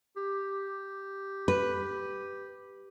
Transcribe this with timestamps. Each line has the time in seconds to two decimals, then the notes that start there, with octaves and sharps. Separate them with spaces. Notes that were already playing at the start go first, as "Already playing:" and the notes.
0.17 G4
1.48 B4